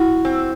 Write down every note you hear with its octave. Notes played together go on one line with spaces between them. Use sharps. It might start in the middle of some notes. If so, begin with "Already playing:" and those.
Already playing: E4 F#4
C4